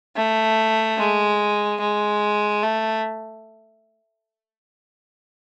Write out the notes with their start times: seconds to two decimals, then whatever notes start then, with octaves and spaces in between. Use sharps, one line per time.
0.16 A3
0.98 G#3
1.80 G#3
2.63 A3